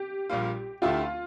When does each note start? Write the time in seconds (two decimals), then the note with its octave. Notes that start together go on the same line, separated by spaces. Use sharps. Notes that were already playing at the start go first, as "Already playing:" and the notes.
Already playing: G4
0.29 A#1 A#2 G3 A#3 F4
0.82 D2 D3 A3 E4 F4 G4